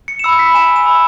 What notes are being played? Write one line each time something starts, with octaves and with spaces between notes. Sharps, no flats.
C#7
E7
B5 E6 C#7
B6
G#5 E7
E7
B5 E6